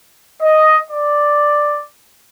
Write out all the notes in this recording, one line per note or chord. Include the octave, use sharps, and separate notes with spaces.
D#5
D5